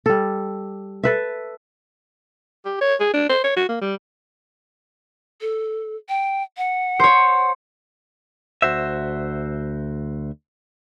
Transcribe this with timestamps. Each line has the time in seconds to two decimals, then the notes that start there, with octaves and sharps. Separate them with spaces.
0.06 G3 A4
1.03 A4 B4 E5
2.65 G4
2.81 C#5
3.00 G#4
3.14 D4
3.29 C5
3.44 C#5
3.56 F#4
3.69 A#3
3.81 G3
5.41 A4
6.09 G5
6.57 F#5
7.00 C5 C#5
8.62 D2 F#4 C5 E5